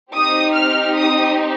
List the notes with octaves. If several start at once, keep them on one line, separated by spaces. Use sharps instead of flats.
C4 D#4 G4 D#6
F6
D#6